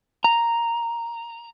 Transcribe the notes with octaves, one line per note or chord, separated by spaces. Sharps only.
A#5